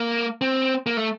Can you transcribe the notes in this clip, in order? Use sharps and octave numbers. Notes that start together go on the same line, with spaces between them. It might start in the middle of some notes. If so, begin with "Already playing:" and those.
Already playing: A#3
C4
A#3
A3